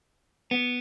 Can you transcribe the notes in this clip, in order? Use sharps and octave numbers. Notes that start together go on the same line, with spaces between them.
B3